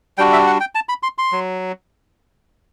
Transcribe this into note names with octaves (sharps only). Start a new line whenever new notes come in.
G3 D4 F#4 G5
E5
F#5
G5
A5
B5
C6
C6
F#3